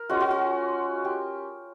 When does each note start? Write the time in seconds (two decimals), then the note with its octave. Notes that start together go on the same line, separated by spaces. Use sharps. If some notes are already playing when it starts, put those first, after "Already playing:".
Already playing: A#4
0.09 G#3 C#4 F4 F#4
0.20 F#4
0.31 F#4
1.05 G4